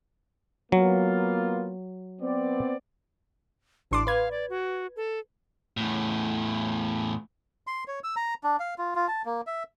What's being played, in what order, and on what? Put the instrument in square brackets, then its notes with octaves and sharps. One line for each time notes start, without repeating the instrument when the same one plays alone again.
[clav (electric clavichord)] F#3 [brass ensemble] A#3 B3 F4
[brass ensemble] B3 C4 D5
[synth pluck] A1 C6 D6 [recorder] D4
[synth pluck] B4 G#6 [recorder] F5
[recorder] D5
F#4
A4
[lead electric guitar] E2 A2
[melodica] C6
C#5
E6
A#5
D4
F5
F4
F4
A5
A#3
E5